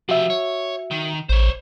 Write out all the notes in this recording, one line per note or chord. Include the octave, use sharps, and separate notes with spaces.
F3 F#4 G4 E5
C#5
D#3
A1 C5 C#5